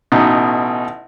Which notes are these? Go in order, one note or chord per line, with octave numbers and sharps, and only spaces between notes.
A1 B2 D#4